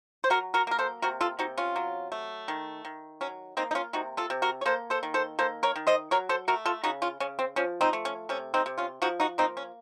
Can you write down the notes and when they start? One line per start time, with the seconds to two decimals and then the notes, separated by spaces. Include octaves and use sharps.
0.24 C5
0.30 F#3 F#4 A#4
0.54 F#4 A#4
0.67 A#3 A#4
0.79 A4 C5
1.02 C3 F#4 A#4
1.21 F4 A4
1.39 C3 D#4 F#4
1.58 C#4 F4
1.76 F#3
2.12 A3
2.48 D#3
2.85 D#3
3.21 F#3 C#4
3.57 A#3 C4 D#4
3.71 D#4
3.75 C#4 F4
3.93 C3 D#4 F#4
4.17 F4 A4
4.30 C3
4.42 F#4 A#4
4.61 C#5
4.66 A#3 A4 C5
4.90 A4 C5
5.03 D#3
5.14 A4 C5
5.39 A#3 A4 C5
5.63 A#4 C#5
5.76 D#3
5.87 C5 D#5
6.11 F#3 A#4 C#5
6.29 A4 C5
6.48 A3 F#4 A#4
6.66 F4 A4
6.84 C#3 D#4 F#4
7.02 C#4 F4
7.20 C#3 C#4
7.39 C4
7.56 F3 C#4
7.81 C4 D#4
7.93 A3
8.05 C#4
8.29 C3 C#4
8.54 C4 D#4
8.66 C3
8.78 C#4 F4
9.02 F3 D#4 F#4
9.20 D#4 F#4
9.38 A#3 C4 D#4
9.57 C#4